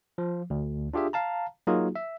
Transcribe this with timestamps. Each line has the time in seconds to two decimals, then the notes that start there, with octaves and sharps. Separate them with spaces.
0.18 F3
0.50 D2
0.94 D4 F4 G4 G#4 E5
1.13 F5 A5 A#5
1.67 F#3 A#3 D#4 F4 F#4 G#4
1.95 E5